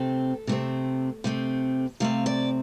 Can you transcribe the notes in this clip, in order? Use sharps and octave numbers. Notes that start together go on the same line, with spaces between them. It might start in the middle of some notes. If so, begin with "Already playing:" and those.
Already playing: C3 A3 C4 A4
C3 A3 C4
C3 A3 C4
C3 A3 C4 F5
D5